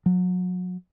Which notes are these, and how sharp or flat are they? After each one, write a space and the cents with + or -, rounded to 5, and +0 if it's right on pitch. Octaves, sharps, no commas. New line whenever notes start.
F#3 -30